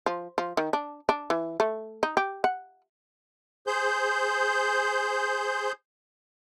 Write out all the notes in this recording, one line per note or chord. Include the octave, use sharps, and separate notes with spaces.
F3
F3
D#3
D4
D4
E3
A3
D#4
G4
F#5
G#4 C5 G6